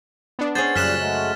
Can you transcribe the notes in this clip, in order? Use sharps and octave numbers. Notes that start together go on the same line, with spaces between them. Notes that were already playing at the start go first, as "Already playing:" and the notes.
B3 D4
C#4 G#4 C5 F#5 A6
F#2 A#2 C#3 G3 F6 F#6 B6 E7
F#3 G#3 A3